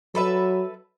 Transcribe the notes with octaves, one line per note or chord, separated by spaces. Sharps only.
F#3 A4 B4 E5